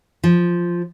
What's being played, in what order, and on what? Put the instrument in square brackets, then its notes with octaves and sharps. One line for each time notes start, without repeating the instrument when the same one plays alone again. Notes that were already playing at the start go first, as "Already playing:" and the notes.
[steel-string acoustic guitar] F3